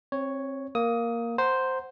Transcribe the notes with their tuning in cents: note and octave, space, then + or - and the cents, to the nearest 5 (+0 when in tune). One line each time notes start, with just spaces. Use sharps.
C4 +25 C#5 +0
A#3 +0 D#6 +20
C5 +0 F#5 +0 A#5 +0